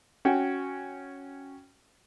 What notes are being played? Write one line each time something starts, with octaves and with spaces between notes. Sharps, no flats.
C#4 F#4 G5